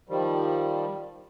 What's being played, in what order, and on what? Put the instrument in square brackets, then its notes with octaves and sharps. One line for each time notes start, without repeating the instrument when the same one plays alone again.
[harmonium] D#3 F3 G3